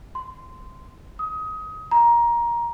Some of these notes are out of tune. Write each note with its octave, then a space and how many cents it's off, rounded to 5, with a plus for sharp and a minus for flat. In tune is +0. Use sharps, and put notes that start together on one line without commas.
C6 -15
D#6 +25
A#5 +15